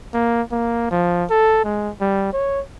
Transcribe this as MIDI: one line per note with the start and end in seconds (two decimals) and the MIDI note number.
0.14 0.42 58
0.51 0.88 58
0.90 1.25 53
1.30 1.61 69
1.64 1.90 56
2.01 2.32 55
2.33 2.60 73